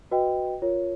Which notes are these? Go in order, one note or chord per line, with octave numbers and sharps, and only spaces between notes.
F#4 B4 D#5 G5
F4 A#4 C#5